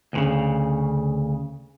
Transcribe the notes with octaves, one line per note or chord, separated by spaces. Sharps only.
D2 A2 C#3